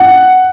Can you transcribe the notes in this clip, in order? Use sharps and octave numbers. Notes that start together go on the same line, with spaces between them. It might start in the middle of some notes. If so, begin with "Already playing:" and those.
Already playing: F#5